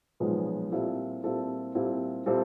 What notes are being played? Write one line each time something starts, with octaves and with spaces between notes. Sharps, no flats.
B1 A#2 F3 G#3 B3
A#2 G3 C4 E4 A4
A#2 G3 C4 E4 A4
A#2 G3 C4 E4 A4
A#2 G3 C4 E4 A4